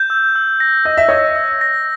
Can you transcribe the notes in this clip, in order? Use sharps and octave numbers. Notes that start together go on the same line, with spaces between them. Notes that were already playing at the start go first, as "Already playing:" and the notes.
Already playing: G6
E6
E6
A#6
D#5 G6
E5
C#5 D#5 E6
E6
A#6